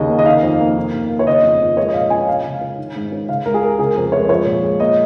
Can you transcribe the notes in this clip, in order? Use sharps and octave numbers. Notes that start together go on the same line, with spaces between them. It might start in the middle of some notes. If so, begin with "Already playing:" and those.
Already playing: D#2 C#3 D#5
A#3
D#5
D#3 F5
F2
A#3
D#3
D#2
A#3
C#5
C#3 D#5
F2
F3
G#3 C#5
D#5
A#2 F5
C#4 G#5
G#3 F5
C#3
C#4
D#3
G#2
C#4
C#3 F5
C#2 A#4
G#4
G#3 A#4
C#3 G#4
F2 A#4
G#3 C#5
F3 C#5
A#2
G#3
A#3 D#5